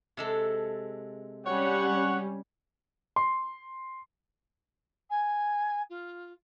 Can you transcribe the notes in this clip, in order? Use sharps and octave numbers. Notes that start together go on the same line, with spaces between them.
C3 G#3 A4
G3 C#4 C#5 F#5
C6
G#5
F4